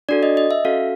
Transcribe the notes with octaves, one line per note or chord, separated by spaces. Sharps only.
D4 F#4 A4 D5
D#5
D#5
E5
C#4 F#4 A4 F5